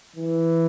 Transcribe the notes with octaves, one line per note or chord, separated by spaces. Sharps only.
E3